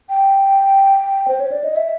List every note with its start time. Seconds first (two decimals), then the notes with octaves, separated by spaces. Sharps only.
0.09 G5
1.28 C5
1.40 C#5
1.52 D5
1.64 D#5
1.76 E5